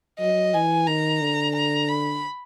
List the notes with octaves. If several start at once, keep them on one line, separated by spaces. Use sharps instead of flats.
F#3 D#5
E3 G#5
D#3 A#5
D3
A#5
B5